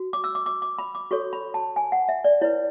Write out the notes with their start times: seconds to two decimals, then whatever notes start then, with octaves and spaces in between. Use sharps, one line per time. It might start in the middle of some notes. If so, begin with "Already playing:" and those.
Already playing: F#4
0.13 D6
0.24 E6
0.35 D6
0.46 D6
0.62 D6
0.78 B5
0.95 D6
1.11 F#4 A4 C#5 C#6
1.33 B5
1.54 A5
1.76 G#5
1.92 F#5
2.09 E5
2.24 D5
2.41 E4 B4 C#5